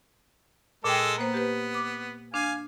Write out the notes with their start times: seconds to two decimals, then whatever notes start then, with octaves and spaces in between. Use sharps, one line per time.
0.84 A#2 G#3 A4 G5
1.18 A#3 B3 C5
1.34 G4 B4
1.74 D6
2.34 D4 F5 G#5